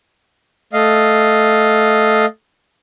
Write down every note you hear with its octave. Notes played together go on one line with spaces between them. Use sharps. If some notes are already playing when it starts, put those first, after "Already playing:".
A3 D#5 F5